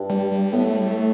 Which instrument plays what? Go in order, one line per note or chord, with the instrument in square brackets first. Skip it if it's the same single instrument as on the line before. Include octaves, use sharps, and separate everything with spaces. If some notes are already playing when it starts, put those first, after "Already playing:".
Already playing: [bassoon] G2
[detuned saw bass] G3
G3
[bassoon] A2 [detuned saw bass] B3
[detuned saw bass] A3
G3
A3